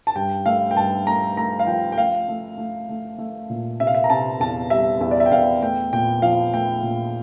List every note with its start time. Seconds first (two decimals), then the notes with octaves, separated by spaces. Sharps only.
0.07 A5
0.16 G2 G5
0.46 A3 F5
0.71 G5
0.76 G2 A5
1.06 A3 A#5
1.37 A3 A#5
1.59 F5
1.67 F3 G5
1.92 G5
1.97 A3 F5
2.29 A3
2.58 A3
2.89 A3
3.18 A3
3.50 A#2
3.80 C3 E5
3.87 F5
3.95 E5
4.04 A#5
4.10 C3 A5
4.40 E2 A5
4.70 G3 E5
5.01 E2 E5
5.11 D5
5.20 E5
5.26 G5
5.31 E2 F5
5.62 A3 G5
5.93 A#2 G5
6.22 F3 F5
6.53 A3 G5
6.83 A#2